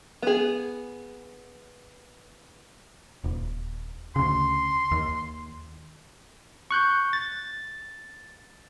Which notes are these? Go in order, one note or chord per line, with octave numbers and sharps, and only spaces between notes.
B3 G#4
D#1
D2 C#3 C6
D#2
C#6 F#6 G6
A6